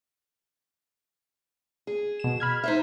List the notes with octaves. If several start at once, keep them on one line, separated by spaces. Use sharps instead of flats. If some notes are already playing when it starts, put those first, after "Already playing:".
G#4
B2 E7
B5 F6 G#6
D#4 C5 E5